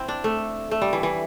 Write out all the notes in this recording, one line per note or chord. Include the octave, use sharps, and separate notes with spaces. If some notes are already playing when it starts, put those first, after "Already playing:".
Already playing: C4 E4
D4
A3
A3
G3
E3
E3